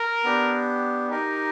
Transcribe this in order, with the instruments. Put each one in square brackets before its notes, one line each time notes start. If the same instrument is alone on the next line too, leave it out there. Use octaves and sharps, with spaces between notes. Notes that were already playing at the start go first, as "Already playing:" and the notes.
Already playing: [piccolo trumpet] A#4
[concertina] B3 D4 G4
D#4 G4 A#4